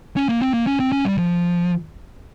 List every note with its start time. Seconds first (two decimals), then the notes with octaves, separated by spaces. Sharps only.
0.16 C#4
0.29 A#3
0.42 C4
0.54 A#3
0.67 C#4
0.80 C4
0.92 C#4
1.05 G3
1.18 F3